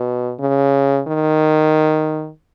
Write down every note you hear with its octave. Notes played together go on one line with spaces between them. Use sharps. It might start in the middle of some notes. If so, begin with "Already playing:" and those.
Already playing: B2
C#3
D#3